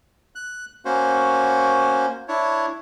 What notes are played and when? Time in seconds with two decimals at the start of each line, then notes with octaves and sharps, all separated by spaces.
0.35 F#6
0.85 A#3 C#4 F#4 C5
2.28 D4 E4 C#5